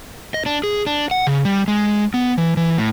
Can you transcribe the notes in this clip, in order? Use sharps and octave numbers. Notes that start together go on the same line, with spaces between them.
D#5
D4
G#4
D4
F#5
C#3
G3
G#3
B3
E3
E3
A2